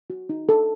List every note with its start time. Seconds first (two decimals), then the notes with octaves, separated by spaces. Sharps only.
0.10 F#4
0.29 D#4
0.49 A4